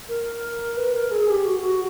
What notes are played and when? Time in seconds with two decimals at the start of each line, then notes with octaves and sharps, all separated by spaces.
0.09 A#4
0.77 B4
0.94 A#4
1.11 G#4
1.28 G4
1.46 F#4
1.62 F#4